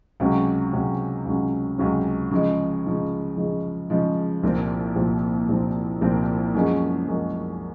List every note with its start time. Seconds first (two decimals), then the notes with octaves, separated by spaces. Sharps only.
0.20 C#2 C3 F#3 C#4
0.73 C#2 C3 F#3 C#4
1.25 C#2 C3 F#3 C#4
1.78 C#2 C3 F#3 C#4
2.31 C#3 F3 G#3
2.84 C#3 F3 G#3
3.37 C#3 F3 G#3
3.90 C#3 F3 G#3
4.43 C2 A#2 F3 C4
4.96 C2 A#2 F3 C4
5.49 C2 A#2 F3 C4
6.01 C2 A#2 F3 C4
6.54 F#2 F3 G#3 C#4 G#4
7.07 F#2 F3 G#3 C#4 G#4